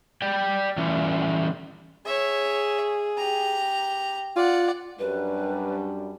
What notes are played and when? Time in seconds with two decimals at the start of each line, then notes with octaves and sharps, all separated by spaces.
0.22 D5 G5
0.77 E3 G3 C#4
2.05 G#4 C#5 E5
3.17 G4 A#5
4.36 F4 D5 F#5
4.99 F#2 G3 D4 B4